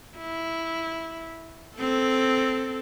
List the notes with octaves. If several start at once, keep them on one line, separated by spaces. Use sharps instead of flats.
E4
C4 A4